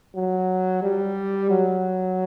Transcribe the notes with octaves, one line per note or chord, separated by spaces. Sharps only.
F#3
G3
F#3